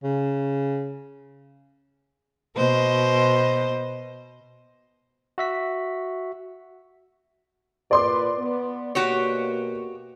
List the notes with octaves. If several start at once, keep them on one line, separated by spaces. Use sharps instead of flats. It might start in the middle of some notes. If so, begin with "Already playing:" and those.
C#3
B2 C5 D#5
F#4 E5 B6
A#2 B4 D5 C6 D6
B3
B2 A#3 F#4 G4 C#5